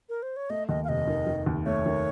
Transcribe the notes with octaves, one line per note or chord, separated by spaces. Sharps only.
A#4
C5
C#5
A3 D#5
D#2 D#5
F5
F1 D#5
D#3
D#3
D#2
A3 C#5
D#3